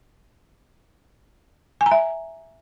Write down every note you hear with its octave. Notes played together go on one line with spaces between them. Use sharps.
G#5
A#5
E5